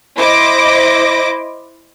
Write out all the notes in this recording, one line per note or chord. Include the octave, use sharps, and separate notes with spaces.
E4 C5 D#5 D6 A#6